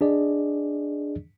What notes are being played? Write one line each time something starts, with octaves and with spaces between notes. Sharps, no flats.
D4 G#4 D5 D#5